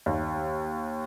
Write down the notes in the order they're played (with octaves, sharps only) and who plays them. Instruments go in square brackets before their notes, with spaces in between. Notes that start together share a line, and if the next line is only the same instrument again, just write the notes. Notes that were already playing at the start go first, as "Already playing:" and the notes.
[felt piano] D#2